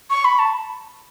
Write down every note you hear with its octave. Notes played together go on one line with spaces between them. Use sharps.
C#6
B5
A5